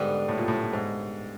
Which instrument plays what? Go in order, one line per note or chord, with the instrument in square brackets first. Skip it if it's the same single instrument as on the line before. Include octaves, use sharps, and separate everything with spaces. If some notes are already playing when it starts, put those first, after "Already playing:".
Already playing: [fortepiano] G#2 [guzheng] D3 G3 B3
[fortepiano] A2
A#2
A2
G#2